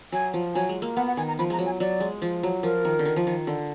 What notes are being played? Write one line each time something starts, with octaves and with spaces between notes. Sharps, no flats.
F#3 G#5
F3
F#3 G#5
G#3
A#3
B3 F#5
F#5
D#3 G#5
A#5
F3 B5
G#3 A#5
F#3
G#5
F#3 D5
G#3
F3
F#3
F3 A#4
D#3
D3
D#3
F3
D#3
D3